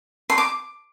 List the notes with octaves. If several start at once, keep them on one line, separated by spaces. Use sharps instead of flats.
C6
D6